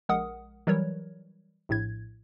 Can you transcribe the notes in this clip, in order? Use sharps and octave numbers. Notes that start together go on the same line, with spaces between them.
A#1 G#3 A#4 F#5 D#6
E3 F#3 G3 A#4 B4 C#5
A#1 A2 G#6